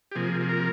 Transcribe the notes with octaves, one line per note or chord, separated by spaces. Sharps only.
G4
C3 F3 A#3 G#4
G#4
A#4